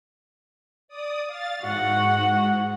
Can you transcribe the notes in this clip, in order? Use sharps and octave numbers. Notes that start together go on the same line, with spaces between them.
D5 D#6
F5 A6
G#2 F#4 F#5